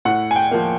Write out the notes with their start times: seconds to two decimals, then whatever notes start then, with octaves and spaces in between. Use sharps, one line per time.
0.05 A2 F#5
0.31 G#5
0.36 G5
0.51 F3 A#3